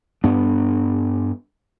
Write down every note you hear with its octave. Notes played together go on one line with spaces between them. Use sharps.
G2 B3 D4